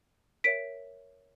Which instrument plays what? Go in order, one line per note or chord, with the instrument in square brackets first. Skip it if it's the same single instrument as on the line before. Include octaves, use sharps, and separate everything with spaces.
[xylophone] A#4 C#5 E5 B6 D7